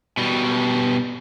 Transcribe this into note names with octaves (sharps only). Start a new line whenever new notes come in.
B2 G3